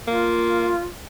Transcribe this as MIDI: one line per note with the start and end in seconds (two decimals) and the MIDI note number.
0.08 0.74 58
0.08 0.87 65